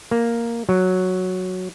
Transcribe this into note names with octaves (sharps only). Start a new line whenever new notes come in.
A#3
F#3